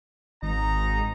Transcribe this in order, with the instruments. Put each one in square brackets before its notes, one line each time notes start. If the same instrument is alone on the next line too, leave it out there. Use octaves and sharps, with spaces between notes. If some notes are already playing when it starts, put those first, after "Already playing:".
[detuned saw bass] G#1 [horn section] G#2 D#4 A#5